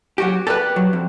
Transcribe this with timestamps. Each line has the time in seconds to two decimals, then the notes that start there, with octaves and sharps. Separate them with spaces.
0.18 F#3 F#4 G4
0.47 G4 A4 B4 D5 F#5
0.76 F#3
0.93 F2